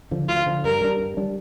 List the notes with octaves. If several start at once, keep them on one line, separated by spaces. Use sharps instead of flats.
D3 F3
D2 F4
D3 F3
G2 A#4
G3 D4
G2
G3 D4